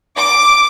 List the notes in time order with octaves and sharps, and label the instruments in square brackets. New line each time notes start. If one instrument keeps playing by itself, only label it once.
[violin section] D6